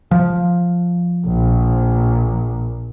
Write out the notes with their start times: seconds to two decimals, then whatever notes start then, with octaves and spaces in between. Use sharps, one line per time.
0.11 F3
1.26 A#1